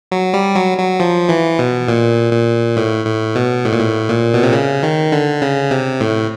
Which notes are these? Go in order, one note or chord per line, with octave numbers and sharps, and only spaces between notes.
F#3
G3
F#3
F#3
F3
E3
B2
A#2
A#2
A2
A2
B2
A2
A#2
A2
A#2
B2
C3
C#3
D#3
D3
C#3
C3
A2